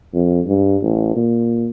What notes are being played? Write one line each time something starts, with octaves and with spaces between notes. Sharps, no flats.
F2
G2
A1
A#2